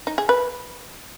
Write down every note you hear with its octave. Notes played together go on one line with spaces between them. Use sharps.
D#4
G#4
B4